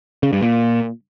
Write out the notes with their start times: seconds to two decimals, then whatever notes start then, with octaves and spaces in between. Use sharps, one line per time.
0.23 C#3
0.33 G2
0.42 A#2